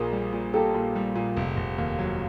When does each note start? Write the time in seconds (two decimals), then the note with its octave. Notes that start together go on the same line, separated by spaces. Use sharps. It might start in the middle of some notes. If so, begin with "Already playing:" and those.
Already playing: A#1 A#2 G#4 A#4
0.13 G3
0.33 A#2
0.53 A#3 G4 A4
0.74 A#2
0.96 G3
1.15 A#2
1.36 F1
1.57 F1
1.78 D#2
1.99 F#3